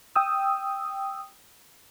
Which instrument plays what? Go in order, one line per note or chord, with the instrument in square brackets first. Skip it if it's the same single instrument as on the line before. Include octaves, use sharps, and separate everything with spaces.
[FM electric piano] G5 D#6 E6